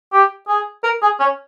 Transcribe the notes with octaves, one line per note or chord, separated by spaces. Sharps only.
G4
G#4
A#4
G#4
C#4